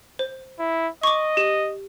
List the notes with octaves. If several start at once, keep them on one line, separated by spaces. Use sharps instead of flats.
C5
E4
D#5 C#6 D6
G4